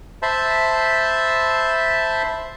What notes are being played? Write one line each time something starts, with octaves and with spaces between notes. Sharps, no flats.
C5 E5 A5 B5